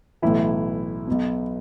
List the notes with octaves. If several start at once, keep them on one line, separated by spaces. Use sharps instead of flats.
B1 A2 E3 E4
B1 B2